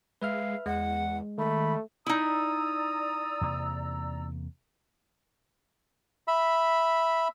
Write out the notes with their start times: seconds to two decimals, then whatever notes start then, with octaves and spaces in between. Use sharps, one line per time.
0.22 G#3 B4 E5 F5 F6
0.66 E2 G#3 F#5
1.38 D#3 A3 B5
2.06 D#4 E4 D5 A#5 D#6 E6
3.41 E2 C3 A#3
6.28 E5 B5